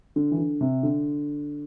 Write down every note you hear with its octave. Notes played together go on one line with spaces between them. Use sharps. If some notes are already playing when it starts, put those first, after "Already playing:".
D3
E3
D3
C3
D3